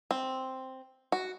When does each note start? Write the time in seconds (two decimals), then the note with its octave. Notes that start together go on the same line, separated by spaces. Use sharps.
0.11 C4
1.12 F#4